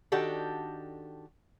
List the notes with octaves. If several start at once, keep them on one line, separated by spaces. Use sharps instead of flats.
D#3 D4 F#4 G4 A4